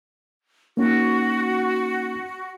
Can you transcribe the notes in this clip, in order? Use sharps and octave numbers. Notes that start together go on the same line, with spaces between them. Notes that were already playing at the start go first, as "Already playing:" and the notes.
A#3 C#4 D#4 F#4